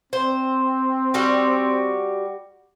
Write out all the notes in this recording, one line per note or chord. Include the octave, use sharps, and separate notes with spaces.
C4 C5
G3 F#4 G4